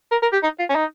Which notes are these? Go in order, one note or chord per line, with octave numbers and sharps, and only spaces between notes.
A#4
A#4
G4
D#4
F4
C#4
D#4